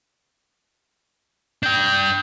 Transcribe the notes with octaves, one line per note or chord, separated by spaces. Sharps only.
D4 G5 G6